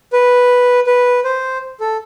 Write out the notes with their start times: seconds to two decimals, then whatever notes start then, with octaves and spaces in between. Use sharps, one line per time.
0.13 B4
0.87 B4
1.24 C5
1.80 A4